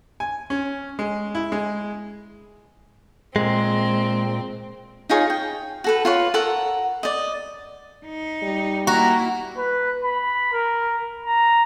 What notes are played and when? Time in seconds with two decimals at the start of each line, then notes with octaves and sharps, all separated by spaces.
0.20 G#5
0.50 C#4
0.99 G#3
1.35 E4
1.52 G#3
3.36 A#2 G#3 C4
5.09 D#4 F4 G#4 C#5
5.30 G5
5.84 F#4 A4 B4
6.05 F4 B4 C#5
6.34 A4 A#4 F#5 A#5
7.03 D5 D#5
8.05 D#4
8.43 G3
8.87 A#3 E4 F#4 A#5
9.57 B4
10.04 B5
10.53 A#4
11.26 A#5